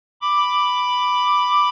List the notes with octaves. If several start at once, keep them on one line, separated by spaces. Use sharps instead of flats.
B5 D6